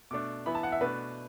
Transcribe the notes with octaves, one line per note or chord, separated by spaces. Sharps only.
B2 A3 D4 D6
E3 B3 E4 B5
A5
F#5
E5
B2 A3 D4 B4